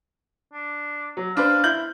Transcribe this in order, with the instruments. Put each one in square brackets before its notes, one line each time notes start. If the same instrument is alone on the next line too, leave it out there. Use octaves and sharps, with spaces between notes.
[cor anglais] D4
[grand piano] F#3
[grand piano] D4 B4 C5 [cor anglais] F5
[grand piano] E4 G6 F#7